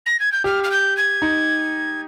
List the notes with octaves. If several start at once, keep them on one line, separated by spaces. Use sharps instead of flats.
A#6
G#6
G6
G4 F6
F6
G6
G#6
D#4